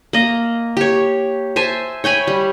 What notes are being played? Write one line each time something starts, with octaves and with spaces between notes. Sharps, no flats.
A#3 D#5
G4 C#5
C5 E5 G#5 A5
C#5 G5 G#5 B5
G3